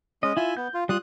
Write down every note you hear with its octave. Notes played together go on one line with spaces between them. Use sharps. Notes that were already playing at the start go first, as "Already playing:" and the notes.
G#3 C#4 D#5
E4 F4 E5 G#5
B3 G6
F4
G3 F4 D#6 F#6